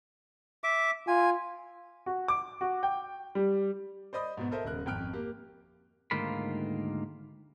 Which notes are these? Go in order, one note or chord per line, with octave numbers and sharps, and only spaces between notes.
E5 D6
F4 G#5
F#4
D6
F#4
G5
G3
C5 D5 D#5 B5 D#6
G#2 B2 B3
A4 A#4 C5 D#5 E5
D#1 C#3 A#4 F#6
G#1 F2 G5 F6 F#6 D7
A#3 G4
D2 G#2 D#3 A#3 F4 B5